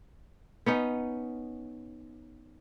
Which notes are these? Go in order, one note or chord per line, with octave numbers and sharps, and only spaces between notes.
B3 C#4 D#4